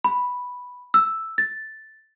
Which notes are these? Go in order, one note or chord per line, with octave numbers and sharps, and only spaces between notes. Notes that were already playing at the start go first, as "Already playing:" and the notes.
B5
E6
A6